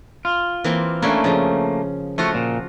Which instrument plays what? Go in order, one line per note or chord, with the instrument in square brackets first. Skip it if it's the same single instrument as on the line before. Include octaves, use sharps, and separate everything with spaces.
[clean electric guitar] F4
[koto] E3 A#3 C4
[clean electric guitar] A3 A#3 [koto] C#4 D4 E4
[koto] C#3 F3
[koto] F3 F4 F#4 [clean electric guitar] A3
[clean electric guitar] A#2